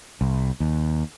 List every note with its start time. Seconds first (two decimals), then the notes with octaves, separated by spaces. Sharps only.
0.21 C2
0.60 D#2